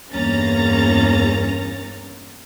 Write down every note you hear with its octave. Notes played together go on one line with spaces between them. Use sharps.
E2 G2 A#3 C#4 A#5 A6